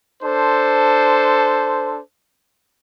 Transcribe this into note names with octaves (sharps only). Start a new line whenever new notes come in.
D4 A4 C5